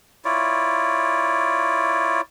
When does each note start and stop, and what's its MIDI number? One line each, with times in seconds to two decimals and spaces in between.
0.25 2.21 64
0.25 2.21 65
0.25 2.21 73
0.25 2.21 74